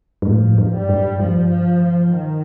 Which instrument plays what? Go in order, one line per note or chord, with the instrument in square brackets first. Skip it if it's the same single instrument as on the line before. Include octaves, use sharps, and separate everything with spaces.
[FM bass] G2
[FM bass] A2 [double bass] F3
[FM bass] G2
[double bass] G3
[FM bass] G2
[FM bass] G2 [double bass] F3
[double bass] F3
F3
D#3